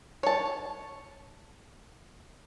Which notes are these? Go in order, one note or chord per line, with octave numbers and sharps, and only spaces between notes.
C#5 A5